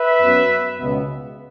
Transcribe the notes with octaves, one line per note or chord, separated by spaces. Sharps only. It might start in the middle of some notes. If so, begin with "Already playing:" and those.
Already playing: B4 E5
F#2 F#3 B3
C#2 B2 B3